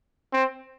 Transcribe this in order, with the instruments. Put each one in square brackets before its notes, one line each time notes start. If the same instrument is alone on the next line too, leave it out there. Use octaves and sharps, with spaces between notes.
[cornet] C4